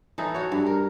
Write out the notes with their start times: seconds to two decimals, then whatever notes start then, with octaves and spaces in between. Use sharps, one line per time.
0.18 E3 D#4 A4
0.34 F#4 C#5
0.52 G2
0.66 A#4